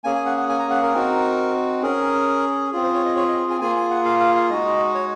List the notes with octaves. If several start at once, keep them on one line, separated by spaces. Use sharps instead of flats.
A#3 C#4 G#4 G#5
G#5
F#5
F#5
G#5
A#5
F#5
A#4
C4 D#4 F#4
C#4 G#4 A#4
C4 F4 G#4
C5
C#5
D#5
C#5
D#5
G#5
A#3 F4 G#4 G#5
G#5
F#5
F5
F5
F5
G#3 D#4 F#4 D#5
C#5